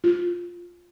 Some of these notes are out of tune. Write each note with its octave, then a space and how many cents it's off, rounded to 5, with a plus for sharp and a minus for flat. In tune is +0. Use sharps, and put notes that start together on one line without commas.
F4 +5